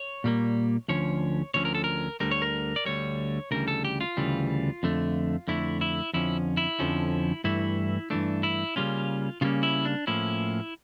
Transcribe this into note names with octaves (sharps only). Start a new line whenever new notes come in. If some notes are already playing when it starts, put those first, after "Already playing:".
Already playing: C#5
A#2 G3 A#3
D2 D3 F3 C#4 C#5
D2 D3 F3 C#4 C#5
A#4
A4
A#4
D2 D3 G3 A#4
C#5
A#4
D5
D2 D3 G3 C#5
D2 C#3 E3 G3 A#4
A4
G4
F4
D2 C#3 E3 G3
F2 D3 A3
F2 D3 A3 E4
E4
F2 D3 F3 C#4 E4
E4
F2 D3 F3 C#4
G2 E3 A3 E4
G2 E3 A3 D4
E4
C#3 G3 A#3 C#4 F4
C#3 G3 A#3 C#4 F4
E4
D4
A2 F3 A#3 C#4 E4